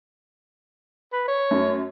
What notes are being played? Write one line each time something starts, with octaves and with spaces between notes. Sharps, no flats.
B4
C#5
F#2 A3